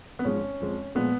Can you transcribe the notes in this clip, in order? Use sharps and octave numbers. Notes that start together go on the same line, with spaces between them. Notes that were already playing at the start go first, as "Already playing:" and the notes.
B3
G#1 G#2 F3 G#3 C#4
F2 F3 G#3
A#2 F3 G#3 B3